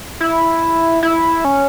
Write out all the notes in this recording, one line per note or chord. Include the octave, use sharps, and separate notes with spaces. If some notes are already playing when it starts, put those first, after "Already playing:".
E4
E4
C#4